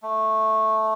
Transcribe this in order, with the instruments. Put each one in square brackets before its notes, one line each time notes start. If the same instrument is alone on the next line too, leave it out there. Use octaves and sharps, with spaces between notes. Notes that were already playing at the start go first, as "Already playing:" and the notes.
[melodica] A3